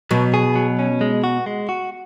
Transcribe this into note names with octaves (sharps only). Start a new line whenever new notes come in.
B2 F#3
G#4
F#3
C#4
G#3
F#4
G#3
F#4